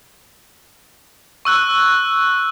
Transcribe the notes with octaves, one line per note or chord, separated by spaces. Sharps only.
C#6 E6 F#6